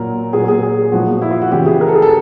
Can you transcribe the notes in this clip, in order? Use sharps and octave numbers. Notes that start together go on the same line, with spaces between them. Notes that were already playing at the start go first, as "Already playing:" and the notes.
Already playing: A#2 F#3 A#4
A#2 F#3 G#4
G#4
G#4
A#2 F3 F#4
E4
F4
F#4
C#3 E3 G4
G#4
A#4
A4
G#4
A4